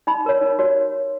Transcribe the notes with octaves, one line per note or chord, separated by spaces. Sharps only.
D#4 B5
F#4 A#4 C#5
D#4
F#4 A#4 C#5